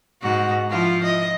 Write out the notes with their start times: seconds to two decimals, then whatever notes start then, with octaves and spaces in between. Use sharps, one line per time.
0.22 G#2 F#4
0.70 F3 E4 F4
1.04 D#5